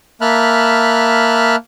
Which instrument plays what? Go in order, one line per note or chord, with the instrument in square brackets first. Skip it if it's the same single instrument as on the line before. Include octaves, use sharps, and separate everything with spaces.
[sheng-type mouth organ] A#3 E5 A5 B5 F6 F#6